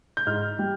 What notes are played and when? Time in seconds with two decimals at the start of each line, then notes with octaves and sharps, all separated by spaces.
0.17 G6
0.27 G#2 F6
0.59 G3